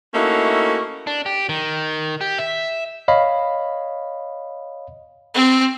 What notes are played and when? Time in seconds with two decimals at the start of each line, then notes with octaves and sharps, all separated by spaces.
0.15 A3 A#3 C#4 D#4 E4 F#4
1.07 D4
1.26 G4
1.49 D#3
2.21 G4
2.38 E5
3.08 C#5 D#5 F5 B5
5.34 C4